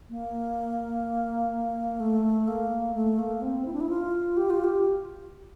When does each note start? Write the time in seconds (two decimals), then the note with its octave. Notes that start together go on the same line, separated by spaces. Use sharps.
0.10 A#3
2.00 A3
2.48 A#3
2.94 A3
3.19 A#3
3.42 C4
3.66 E4
3.73 D4
3.81 E4
3.89 F4
4.37 G4
4.50 F4
4.64 G4